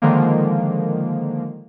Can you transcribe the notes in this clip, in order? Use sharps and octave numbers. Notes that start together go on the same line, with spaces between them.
D3 D#3 F3 G#3 A#3